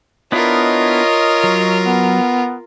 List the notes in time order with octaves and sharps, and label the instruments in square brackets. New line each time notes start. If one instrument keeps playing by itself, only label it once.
[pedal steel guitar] B3 D4 E4 [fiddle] F4 A#4 [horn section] C#5 D#5
[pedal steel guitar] F#3
[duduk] B3